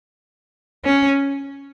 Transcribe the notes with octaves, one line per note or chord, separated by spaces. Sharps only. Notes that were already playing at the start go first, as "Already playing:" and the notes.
C#4